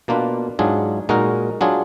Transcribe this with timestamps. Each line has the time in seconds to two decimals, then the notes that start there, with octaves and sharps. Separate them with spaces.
0.08 B2 A#3 D4 F4 B4
0.59 G#2 F#3 D4 F4 G#4
1.09 A#2 G#3 D#4 F#4 A#4
1.61 F#3 D4 F4 G#4